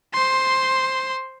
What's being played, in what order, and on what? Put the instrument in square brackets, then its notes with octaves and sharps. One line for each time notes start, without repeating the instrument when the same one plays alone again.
[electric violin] C5 C6